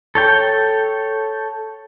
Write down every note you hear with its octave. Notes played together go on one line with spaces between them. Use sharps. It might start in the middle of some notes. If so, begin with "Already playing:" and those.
A4 C#5 G5